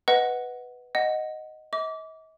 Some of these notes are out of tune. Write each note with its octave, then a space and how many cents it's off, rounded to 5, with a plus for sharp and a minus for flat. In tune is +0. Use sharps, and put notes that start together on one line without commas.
B4 +0 D#5 +10 F#5 +0
D#5 +0 F#5 +0
D#5 +45 D6 -25